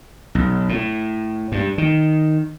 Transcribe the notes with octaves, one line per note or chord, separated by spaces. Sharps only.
B1
A2
G2
D#3